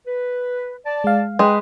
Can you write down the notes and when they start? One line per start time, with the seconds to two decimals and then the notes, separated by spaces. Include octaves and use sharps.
0.06 B4
0.86 D5 A5
1.04 G#3 F5
1.39 G#3 B4 G5